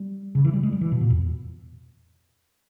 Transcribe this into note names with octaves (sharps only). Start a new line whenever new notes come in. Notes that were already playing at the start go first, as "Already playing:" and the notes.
Already playing: G3
C#3
E3
G3
G#3
G3
E3
B2
A#2
E2